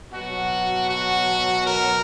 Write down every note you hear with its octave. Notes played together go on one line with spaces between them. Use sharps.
B2 F#3 F#4
F#4
A#4